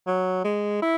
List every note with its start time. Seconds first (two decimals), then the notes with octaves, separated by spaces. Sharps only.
0.07 F#3
0.44 G#3
0.82 E4